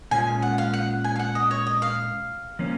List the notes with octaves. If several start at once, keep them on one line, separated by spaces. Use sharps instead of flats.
A#2 G#3 C#4 F4 G#5
F#5
F5
F#5
G#5
F5
F#5
D#5
C#5
D#5
F5
F3 A#3 C#4